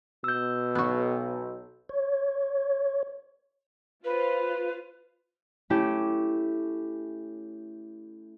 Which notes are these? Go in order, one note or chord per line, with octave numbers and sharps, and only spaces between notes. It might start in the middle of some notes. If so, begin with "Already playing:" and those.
B2 E6 G6
B1 B3 F#4
C#5
F4 B4 C5 F5
A3 C#4 E4 G4